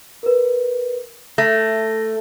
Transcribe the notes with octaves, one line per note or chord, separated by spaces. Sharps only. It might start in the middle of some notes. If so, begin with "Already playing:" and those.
A#4 B4
A3 A#6